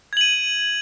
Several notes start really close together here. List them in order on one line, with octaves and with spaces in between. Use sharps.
G#6 F#7 D#7